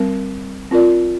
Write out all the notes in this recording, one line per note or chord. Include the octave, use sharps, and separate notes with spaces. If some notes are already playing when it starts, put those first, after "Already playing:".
Already playing: G3 C4 A#4
C4 F4 A#4 D5